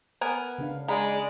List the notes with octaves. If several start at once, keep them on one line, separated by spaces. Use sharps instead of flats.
B3 A#4 G#5
C#3 D4 F5
G#3 D5 A#5 B5